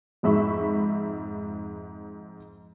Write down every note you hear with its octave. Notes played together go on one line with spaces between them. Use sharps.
F2 G#2 E5 B5 C#6